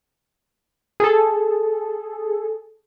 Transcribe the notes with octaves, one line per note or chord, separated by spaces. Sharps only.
G#4 A4